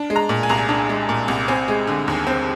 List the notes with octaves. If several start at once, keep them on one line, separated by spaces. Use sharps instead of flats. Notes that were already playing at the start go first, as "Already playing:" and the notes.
Already playing: D4
G#3
A#5
A#2
G#5
C2 A#5
G#5
D4
G#3
A#2
C2
C4 G#5
G#3
D3
D#2
C4